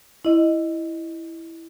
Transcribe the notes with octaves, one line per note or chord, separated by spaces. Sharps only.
E4 D#5